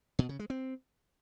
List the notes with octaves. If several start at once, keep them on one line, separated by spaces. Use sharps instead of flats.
B2
C#3
G#3
C4